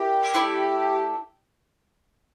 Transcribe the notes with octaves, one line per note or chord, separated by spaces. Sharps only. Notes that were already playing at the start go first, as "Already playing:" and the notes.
Already playing: E4 G4 A#4 D5
A3 E4 A4 D5